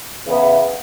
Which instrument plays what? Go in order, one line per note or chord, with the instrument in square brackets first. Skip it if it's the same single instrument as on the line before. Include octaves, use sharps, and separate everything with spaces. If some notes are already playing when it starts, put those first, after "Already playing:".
[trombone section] E2 C#3 E3 B3